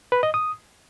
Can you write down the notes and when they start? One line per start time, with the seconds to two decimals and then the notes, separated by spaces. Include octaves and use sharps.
0.12 B4
0.23 D#5
0.34 D#6